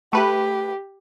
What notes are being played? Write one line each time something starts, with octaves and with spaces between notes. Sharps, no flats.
A3 G4 B4 F#6